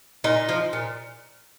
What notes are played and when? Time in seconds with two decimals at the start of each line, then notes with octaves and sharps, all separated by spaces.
0.24 A#2 D#4
0.49 F3
0.73 A#2